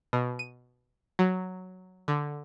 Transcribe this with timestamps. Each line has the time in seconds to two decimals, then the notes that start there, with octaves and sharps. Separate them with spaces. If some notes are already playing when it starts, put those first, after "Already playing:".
0.13 B2
0.39 D#7
1.19 F#3
2.08 D3